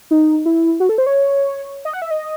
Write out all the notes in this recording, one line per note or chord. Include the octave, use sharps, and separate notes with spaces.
D#4
E4
F#4
A4
C5
C#5
D#5
F#5
E5
D#5